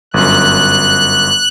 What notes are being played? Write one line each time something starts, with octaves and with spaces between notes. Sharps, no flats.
G1 F#2 F#6